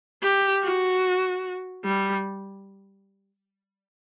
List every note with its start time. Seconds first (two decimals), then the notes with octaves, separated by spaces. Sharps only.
0.23 G4
0.63 F#4
1.84 G3